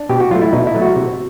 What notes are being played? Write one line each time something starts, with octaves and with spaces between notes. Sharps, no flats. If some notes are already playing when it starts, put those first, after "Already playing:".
Already playing: D4
B2 G4
F#4
F#3 A3 F4
E4
B2 D#4
E4
F#3 A3
F#4
C3